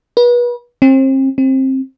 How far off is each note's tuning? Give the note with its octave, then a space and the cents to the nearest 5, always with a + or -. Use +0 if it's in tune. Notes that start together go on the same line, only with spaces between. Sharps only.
B4 -35
C4 +35
C4 +20